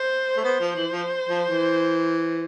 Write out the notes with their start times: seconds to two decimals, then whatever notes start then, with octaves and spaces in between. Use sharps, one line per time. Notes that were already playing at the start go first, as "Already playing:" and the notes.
Already playing: C5
0.37 A3
0.44 B3 C5
0.60 F3
0.76 E3
0.92 F3
1.29 F3
1.49 E3